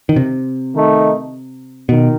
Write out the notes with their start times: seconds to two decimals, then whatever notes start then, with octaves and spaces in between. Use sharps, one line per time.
0.09 D#3
0.16 C3
0.73 D#3 A3 D#4
1.88 B2 D#3